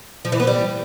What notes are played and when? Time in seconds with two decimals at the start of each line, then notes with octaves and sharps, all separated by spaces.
0.25 F3
0.32 E3
0.40 B3
0.47 G3